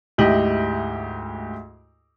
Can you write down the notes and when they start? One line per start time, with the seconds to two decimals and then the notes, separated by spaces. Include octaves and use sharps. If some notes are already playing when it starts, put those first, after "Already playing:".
0.18 D2 G#2 E4 G4 D#5 F#7